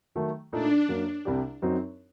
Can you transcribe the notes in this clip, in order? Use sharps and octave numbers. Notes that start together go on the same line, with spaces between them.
D#3 F#3 A3
A#2 A3 D4 D#4 A4
F#2 F#3 A#3
C2 C3 G3 D4 G4
F#2 F#3 C4 D#4